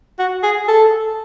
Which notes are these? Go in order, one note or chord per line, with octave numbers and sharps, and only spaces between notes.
F#4
G#4
A4